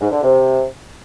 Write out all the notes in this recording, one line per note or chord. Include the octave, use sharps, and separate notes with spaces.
G#2
D3
C3